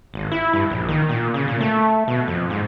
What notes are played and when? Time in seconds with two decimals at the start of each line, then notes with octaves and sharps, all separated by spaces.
0.14 G#1
0.32 E4
0.53 G2
0.70 A#1
0.89 D#3
1.09 A#2
1.34 C#3
1.48 A#2
1.60 A3
2.08 B2
2.28 F2
2.50 G#2